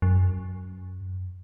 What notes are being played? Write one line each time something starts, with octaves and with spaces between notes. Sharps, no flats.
F#2